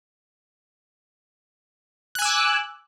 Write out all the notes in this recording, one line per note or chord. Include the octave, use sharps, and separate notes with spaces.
G#5 D6 E6 F#6